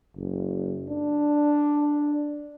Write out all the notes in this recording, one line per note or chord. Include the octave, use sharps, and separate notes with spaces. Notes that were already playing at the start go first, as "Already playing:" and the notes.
F#1
D4